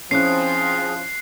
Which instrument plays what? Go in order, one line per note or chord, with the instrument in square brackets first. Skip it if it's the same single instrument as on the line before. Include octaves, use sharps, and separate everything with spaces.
[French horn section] F3 [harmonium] C4 G#4 [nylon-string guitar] C#4 E4 [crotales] F#6 C7